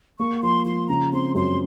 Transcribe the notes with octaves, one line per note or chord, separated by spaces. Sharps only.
A#3 C#6
F3 C6
F3 C6
C#3 A#5
C4 C6
F#2 C6